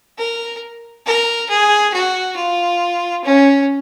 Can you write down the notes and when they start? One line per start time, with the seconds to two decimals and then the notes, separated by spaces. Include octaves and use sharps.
0.18 A#4
1.06 A#4
1.49 G#4
1.94 F#4
2.37 F4
3.24 C#4